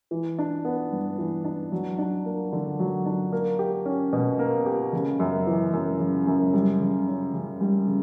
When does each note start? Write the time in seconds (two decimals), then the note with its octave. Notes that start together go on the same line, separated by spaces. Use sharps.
0.11 E3
0.38 D4
0.65 B3
0.92 G2
1.18 E3
1.44 D4
1.72 F#3
1.98 D4
2.25 A#3
2.53 D3
2.79 F#3
3.06 D4
3.32 A#3
3.59 G4
3.85 C#4
4.13 B2
4.39 A#3
4.66 G4
4.93 C#3
5.20 F#2
5.47 E3
5.73 F#2
6.00 C#3
6.27 F#2
6.53 G3
6.81 C#3
7.07 C#4
7.34 C#3
7.61 G3
7.88 C#3